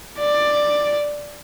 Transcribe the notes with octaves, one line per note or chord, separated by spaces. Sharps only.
D5